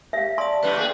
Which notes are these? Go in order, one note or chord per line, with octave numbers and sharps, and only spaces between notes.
G4 E5 F5
D5 A5 C6
F#2 A2 B3 B4
A3 A#3 G#4 G5